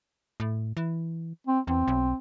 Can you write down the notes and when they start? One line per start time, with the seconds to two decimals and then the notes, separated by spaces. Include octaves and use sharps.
0.40 A2
0.77 E3
1.47 C4
1.67 E2 C4
1.88 B1